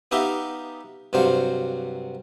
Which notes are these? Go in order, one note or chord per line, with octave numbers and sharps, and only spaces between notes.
B3 D#4 G4 E5 F5 G5
G2 C3 F#3 C5 F5